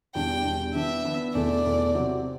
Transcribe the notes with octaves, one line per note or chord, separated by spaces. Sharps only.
E2 B2 G3 D4 G5
E2 B2 G3 D4
E3 B3 D4 E5
E3 B3 D4
E2 B2 A3 D5
E2 B2 A3
C3 F#3 C4 F#4